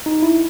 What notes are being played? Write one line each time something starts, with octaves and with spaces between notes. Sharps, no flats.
D#4
E4